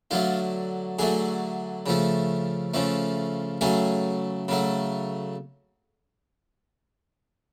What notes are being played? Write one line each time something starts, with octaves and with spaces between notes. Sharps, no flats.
D3 F#3 A3 F4
D3 F#3 A3 G#4
C#3 F3 A3
C#3 F3 A3
C#3 F#3 A3 G#4
C#3 F#3 A3